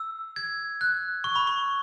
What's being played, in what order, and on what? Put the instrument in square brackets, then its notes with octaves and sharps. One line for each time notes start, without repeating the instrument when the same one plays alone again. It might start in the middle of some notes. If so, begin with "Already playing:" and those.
Already playing: [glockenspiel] E6
G#6
F#6
C#6
B5
C#6